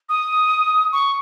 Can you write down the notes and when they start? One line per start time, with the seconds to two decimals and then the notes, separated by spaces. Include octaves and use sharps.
0.09 D#6
0.92 C#6